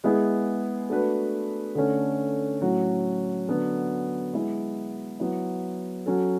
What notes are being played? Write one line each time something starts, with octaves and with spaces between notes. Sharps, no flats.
G#3 B3 E4 G#4
A3 D4 F#4 B4
D3 A3 C#4
A2 F#3 C#4 F#4
D3 F#3 B3 D4
G#3 B3 E4
F#3 B3 E4
F#3 C#4 F#4 A4